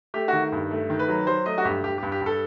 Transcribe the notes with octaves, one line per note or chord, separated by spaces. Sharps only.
A3 G4
D#3 F#4
G2
A3
D#3
B4
F#3
F#3 C5
A3 D#5
F#4
G2 G4
G2 G4
G2 G4
G4
G2 A4